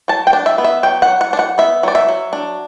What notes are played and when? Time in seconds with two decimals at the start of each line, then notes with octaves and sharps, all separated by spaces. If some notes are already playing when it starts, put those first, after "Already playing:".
0.08 F#3 A5
0.27 G5
0.33 D4
0.46 E5
0.58 B3
0.64 E5
0.83 F#3 G5
1.02 F#5
1.08 F#3
1.21 F#5
1.33 D4
1.39 F#5
1.58 B3 E5
1.83 F#3 D5
1.95 E5
2.09 F#3
2.33 D4